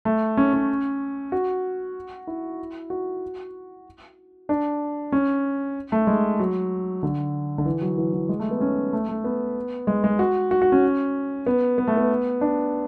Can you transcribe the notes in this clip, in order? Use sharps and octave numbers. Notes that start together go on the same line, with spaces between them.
A3
C#4
C#4
F#4
E4
F#4
D4
C#4
A3
G#3
F#3
D3
D3
E3
F#3
E3
E3
G#3
A3
B3
C#4
A3
A3
B3
G#3
G#3
F#4
F#4
F#4
C#4
B3
B3
A3
B3
D4